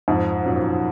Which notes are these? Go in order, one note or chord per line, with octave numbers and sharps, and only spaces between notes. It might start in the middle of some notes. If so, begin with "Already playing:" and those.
F2 G#2
F#2 A#2